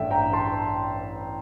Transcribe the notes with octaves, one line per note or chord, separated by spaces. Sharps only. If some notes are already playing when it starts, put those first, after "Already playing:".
Already playing: A1 G2 A3 D5 E5 G5
G5 A#5
A5 C6